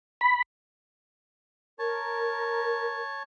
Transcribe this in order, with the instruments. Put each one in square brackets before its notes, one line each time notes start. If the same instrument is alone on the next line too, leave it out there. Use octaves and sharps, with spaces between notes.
[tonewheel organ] B5
[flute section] A#4 [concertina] C#5 A5